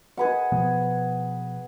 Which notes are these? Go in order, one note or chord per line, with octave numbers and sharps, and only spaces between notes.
G#4 B4 F#5
B2 F3 B3